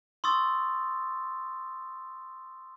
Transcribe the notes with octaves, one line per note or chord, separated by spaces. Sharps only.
C6 C#6 D#6 E6 A6